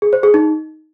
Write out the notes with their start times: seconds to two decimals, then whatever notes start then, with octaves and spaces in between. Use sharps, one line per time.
0.02 G#4
0.13 C5
0.23 G#4
0.34 D#4